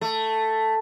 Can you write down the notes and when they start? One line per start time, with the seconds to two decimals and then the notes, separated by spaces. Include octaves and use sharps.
0.01 A3